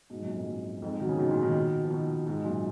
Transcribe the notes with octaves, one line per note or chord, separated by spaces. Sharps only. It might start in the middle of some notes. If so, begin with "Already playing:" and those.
G#2 B2
F#2 A#2
F2 G#2
F#2
F2 G#2
D#3 F#3
C#3 F3
B2 D#3
A#2 C#3
B2 D#3
F3
B2 D#3
G#2 B2
F#2 A#2